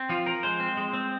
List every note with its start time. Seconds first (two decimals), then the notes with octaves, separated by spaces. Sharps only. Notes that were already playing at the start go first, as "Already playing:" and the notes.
Already playing: C4
0.09 F3 F4
0.26 F3 A#4
0.43 G#3 C5
0.60 C4
0.77 G#3
0.94 C4